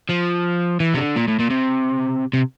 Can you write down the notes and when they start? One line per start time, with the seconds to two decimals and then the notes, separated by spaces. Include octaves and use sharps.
0.09 F3
0.80 E3
0.94 C3
0.97 D3
1.16 A#2
1.28 A2
1.39 A#2
1.50 C3
2.33 C3